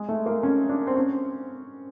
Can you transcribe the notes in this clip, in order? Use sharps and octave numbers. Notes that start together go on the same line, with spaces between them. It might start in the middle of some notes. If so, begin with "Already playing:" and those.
Already playing: G#3
A3
A#3
C#4
D4
C4
C#4